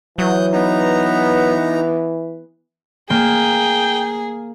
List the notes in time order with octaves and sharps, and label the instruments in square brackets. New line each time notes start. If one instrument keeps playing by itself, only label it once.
[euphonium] E3 [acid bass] F#3 [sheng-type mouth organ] D#6 F#6 G6
[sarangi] B3 [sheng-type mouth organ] D#4 A#5
[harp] A#3 [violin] G#4 [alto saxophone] G5